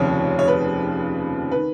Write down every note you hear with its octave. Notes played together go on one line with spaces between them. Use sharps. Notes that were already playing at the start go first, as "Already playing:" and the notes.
Already playing: F1 D#2 C#3 F3 C#5
C#5
B4
D#3 B4